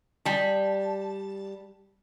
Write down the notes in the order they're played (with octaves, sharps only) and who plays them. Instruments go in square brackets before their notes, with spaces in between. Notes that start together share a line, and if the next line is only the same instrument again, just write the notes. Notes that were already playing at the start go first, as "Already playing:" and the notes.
[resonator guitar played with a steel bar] G3 A5